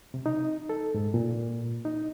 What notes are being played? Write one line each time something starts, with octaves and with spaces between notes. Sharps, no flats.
C3
D#4
A4
G#2
A#2
D#4